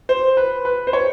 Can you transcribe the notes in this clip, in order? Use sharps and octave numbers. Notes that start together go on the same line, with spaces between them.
C5
B4
B4
C5
C#5